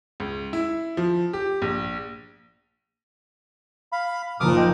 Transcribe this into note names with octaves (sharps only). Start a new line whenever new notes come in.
C#2
E4
F3
G4
A#1
F5 B5
F#1 A#2 F3 D#4 D6 D#6 F6
D#5 G5